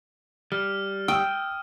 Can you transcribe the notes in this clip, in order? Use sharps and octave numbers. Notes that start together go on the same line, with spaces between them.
G3 F6
G5 D#6 E6